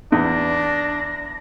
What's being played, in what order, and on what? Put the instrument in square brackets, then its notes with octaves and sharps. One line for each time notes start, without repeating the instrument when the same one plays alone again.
[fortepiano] E2 [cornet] D4 [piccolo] A#6